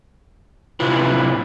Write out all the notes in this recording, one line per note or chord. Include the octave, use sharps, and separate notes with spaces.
C3 E4 F4 B4